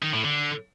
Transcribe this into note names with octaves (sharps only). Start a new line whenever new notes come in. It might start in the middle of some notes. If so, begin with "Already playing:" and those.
D#3
A2
D3